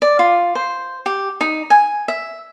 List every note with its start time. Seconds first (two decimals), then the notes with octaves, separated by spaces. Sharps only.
0.02 D5
0.19 F4
0.55 C5
1.06 G4
1.41 D#4
1.70 G#5
2.08 E5